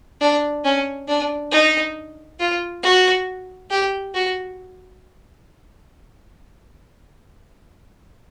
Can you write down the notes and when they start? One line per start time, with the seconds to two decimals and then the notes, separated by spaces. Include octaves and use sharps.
0.21 D4
0.65 C#4
1.08 D4
1.52 D#4
2.39 F4
2.83 F#4
3.70 G4
4.14 F#4